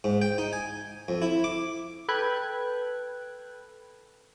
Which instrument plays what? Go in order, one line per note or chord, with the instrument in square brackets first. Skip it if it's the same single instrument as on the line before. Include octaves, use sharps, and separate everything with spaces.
[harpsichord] G#2
G5
D#4
G#5
F2
E4
D6
[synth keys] A4 B4 G5 F#6 G#6